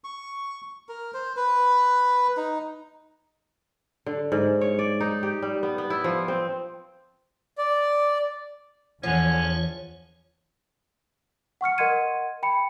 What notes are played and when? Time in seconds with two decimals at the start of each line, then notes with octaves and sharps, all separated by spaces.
0.04 C#6
0.89 A#4
1.14 C5
1.37 B4
2.37 D#4
4.06 D3
4.32 G#2
4.61 C#5
4.79 D5
5.00 D#4
5.23 G4
5.42 G3
5.63 B3
5.78 B3
5.90 E4
6.04 F3
6.28 C4
7.58 D5
9.03 E2 D3 F3 C#4 C#5
11.61 F#5 C#6 F6 C#7
11.78 A#4 D#5 F#5 C6 G#6 D#7
12.43 G5 B5 C#7